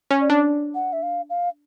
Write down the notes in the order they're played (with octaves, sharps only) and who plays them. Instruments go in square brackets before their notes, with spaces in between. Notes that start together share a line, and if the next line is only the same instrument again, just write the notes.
[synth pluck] C#4
[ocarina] D5
[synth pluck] D4
[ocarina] F#5
E5
F5
F5